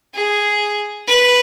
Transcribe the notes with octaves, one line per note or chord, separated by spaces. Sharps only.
G#4
B4